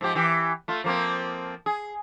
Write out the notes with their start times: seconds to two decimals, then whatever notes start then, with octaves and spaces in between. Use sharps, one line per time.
0.01 G#2 F3 G4
0.15 E3 G4
0.68 A3 F4
0.84 F3 A#3 C4
1.66 G#4